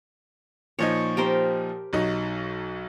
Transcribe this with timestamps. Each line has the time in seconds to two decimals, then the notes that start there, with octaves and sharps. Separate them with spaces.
0.79 A#2 F3 D#4 C#5
1.17 G4 A#4 C5
1.93 B1 F#3 D#4